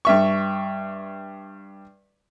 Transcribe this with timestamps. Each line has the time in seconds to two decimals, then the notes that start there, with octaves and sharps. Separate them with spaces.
0.05 G2 E5 C#6